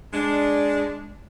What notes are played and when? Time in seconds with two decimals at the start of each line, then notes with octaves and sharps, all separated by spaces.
0.13 G#3 D4